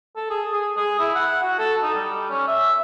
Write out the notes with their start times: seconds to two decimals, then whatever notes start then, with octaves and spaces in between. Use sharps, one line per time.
0.16 A4
0.30 G#4
0.52 G#4
0.77 G#4
0.99 E4
1.15 F#5
1.42 F#4
1.58 A4
1.83 D#4
1.95 G3
2.30 C#4
2.48 E5